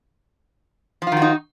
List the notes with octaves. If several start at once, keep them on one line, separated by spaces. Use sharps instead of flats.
D#3 F3 D#4 F4 F#4